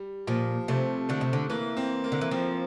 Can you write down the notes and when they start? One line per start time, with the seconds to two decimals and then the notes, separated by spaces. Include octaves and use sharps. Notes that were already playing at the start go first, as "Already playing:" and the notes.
Already playing: G3
0.27 A#2 F3
0.68 C3 A3
1.09 D3 A3
1.21 C3
1.33 D3
1.50 E3 A#3
1.77 C4
2.04 A#3
2.12 D3
2.21 E3
2.31 F3 C4